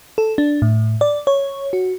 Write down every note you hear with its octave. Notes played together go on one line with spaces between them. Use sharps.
A4
D4
A2
D5
C#5
F#4